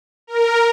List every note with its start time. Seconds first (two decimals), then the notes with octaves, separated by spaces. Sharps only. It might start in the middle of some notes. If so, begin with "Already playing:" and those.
0.27 A#4